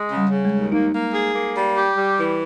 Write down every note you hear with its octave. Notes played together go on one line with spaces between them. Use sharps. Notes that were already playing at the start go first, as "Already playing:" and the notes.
Already playing: G#3
C#3
G3
C#3
G#3
D#2
A#3 D#4
A#3
G#4
A#3
G3
G4
G3
E3